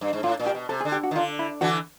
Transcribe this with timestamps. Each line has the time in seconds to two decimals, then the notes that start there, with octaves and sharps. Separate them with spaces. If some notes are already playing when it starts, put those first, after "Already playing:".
0.01 G2
0.13 G#2
0.23 A2 F4
0.39 A#2
0.47 G4
0.55 B2
0.69 C3 A4
0.81 G#4
0.85 D3
0.92 G4
1.04 F#4
1.11 D#3
1.16 D3 F4
1.39 E4
1.61 D3 E3 F#4